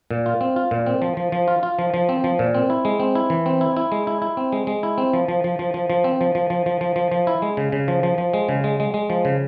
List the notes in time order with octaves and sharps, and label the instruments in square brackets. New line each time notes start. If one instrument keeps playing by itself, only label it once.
[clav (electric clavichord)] A#2
F4
C4
F4
A#2
C4
F3
F3
F3
F4
F4
F3
F3
C4
F3
A#2
C4
E4
G#3
C4
E4
E3
C4
E4
E4
G#3
E4
E4
C4
G#3
G#3
E4
C4
F3
F3
F3
F3
F3
F3
C4
F3
F3
F3
F3
F3
F3
F3
E4
G#3
C#3
C#3
F3
F3
F3
G#3
C#3
G#3
G#3
G#3
F3
C#3